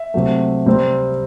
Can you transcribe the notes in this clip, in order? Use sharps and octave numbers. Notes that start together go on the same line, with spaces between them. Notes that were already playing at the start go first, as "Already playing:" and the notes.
Already playing: E5
C3 F#3 A3
C3 G3 C4